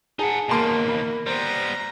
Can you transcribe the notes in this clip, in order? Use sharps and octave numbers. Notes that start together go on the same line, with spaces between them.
D#4 G#4 F#5 G#5 A5
D#2 B2 A#3 A5 C6 D7
B5
G3 B3 C5 A#5